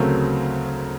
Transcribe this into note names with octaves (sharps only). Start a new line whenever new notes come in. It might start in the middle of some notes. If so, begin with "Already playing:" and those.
Already playing: D2 C#3 F#3 A3 C4 A#4